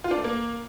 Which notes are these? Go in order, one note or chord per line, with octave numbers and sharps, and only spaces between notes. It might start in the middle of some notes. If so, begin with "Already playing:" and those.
F4
D4
A3
A#3